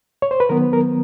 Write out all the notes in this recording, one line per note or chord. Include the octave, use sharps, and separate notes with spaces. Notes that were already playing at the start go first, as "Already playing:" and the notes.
C#5
C5
B4
D#3 F#3 B3 A#4
A#4